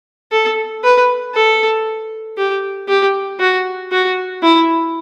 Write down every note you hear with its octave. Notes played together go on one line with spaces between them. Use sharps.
A4
B4
A4
G4
G4
F#4
F#4
E4